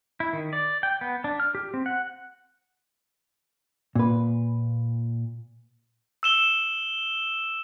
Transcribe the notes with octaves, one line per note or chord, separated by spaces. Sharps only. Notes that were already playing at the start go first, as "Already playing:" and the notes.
E4
D#3
D5
G5
B3
D4
F6
G4
C4
F#5
A#2 B4
E6 E7 G7